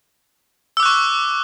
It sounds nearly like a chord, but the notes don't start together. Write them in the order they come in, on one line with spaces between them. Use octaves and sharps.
E6 D6 F#6 C#6